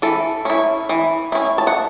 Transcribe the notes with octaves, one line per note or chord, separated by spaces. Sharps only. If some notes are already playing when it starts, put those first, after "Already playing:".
E3 A4
C#4 E4
E3
C#4 E4
A5
F#5